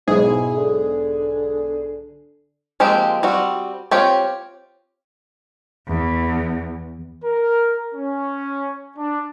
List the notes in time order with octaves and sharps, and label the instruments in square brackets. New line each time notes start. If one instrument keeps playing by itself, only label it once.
[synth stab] B1 G#2 G#4 [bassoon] E4
[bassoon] D3
[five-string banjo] F3 G#3 A#3 C4 G4
G3 C4 F#4
C4 F4 G4 C#5
[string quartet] E2
[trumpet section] A#4
C#4
D4